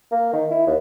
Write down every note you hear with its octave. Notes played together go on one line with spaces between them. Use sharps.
A#3
D#3
E4
D#2